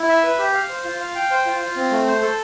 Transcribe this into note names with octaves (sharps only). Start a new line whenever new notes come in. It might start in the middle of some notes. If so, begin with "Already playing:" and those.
Already playing: E4
E5
B4
G4
F5
C5
F4
F5
G5
C5
F4
F4
C4
A3
C5
A4